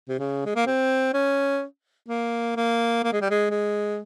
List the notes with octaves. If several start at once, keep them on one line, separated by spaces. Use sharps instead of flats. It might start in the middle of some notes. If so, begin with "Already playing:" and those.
C3
C#3
G#3
A#3
C4
C#4
A#3
A#3
A#3
G#3
G3
G#3
G#3